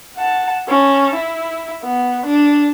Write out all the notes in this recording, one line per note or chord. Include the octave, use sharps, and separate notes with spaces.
F#5 A5
C#4 A5
E4
B3
D4